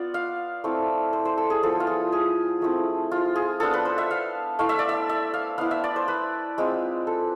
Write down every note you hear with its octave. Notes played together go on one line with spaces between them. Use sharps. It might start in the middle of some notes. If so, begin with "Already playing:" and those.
Already playing: B3 F4 D5
F5
A3 C4 E4
C5
C5
A4
G#4
F3 B3 E4 A4
F4
G#4
G#4
F3 A3 C4 E4
F4
G#4
B3 D4 F4 A4
B4
C5
E5
F5
A3 E4 F5
E5
D5
E5
E5
F5
B3 E4 F5
E5
D5
C5
B4
G#3 C4 F4
A4